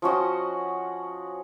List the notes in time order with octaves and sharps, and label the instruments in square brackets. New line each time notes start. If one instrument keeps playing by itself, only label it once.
[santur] F3 C#4 F#4 D#5